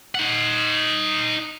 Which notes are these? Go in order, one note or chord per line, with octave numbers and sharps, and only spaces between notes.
D#4 F#5